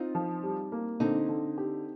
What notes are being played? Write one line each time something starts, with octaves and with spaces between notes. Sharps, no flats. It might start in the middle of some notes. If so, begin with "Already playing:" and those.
Already playing: C4 D#4 F4
F3
G3
A#3
D3 C4 D#4
D3
G4